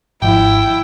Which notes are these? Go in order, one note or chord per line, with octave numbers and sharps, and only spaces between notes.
G#1 F3 E4 G5